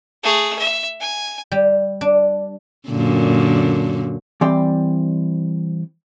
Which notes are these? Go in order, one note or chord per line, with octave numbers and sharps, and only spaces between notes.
A3 G#4
E5
G#5
G3
D4
F#2 A#2 D3
E3 G3 C4 D5 G5